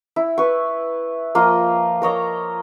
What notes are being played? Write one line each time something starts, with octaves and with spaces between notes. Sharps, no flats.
E4
B4 C#6
F3 A#3 F4 D#5
A#4 C#5 D#5 A#5